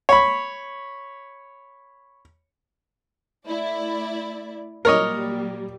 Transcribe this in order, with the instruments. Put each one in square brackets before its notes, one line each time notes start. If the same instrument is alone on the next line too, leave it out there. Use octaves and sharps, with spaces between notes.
[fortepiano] C#5 B5
[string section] A3 E4 D5
[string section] A#2 F#3 G3 [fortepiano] A#4 C#5 D#5